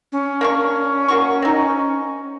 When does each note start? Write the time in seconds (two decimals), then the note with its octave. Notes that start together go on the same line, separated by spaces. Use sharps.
0.12 C#4
0.41 A#3 D4 C#6
1.08 A#3 F#4 C#6
1.42 C4 D#4